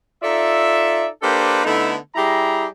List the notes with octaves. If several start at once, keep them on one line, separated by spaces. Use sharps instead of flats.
D#4 F4 A4 D5 E5
A#3 D4 G4 A4 B4 C5
D3 A3 B3 D#4 E4
G3 E4 G4 G#4 A#5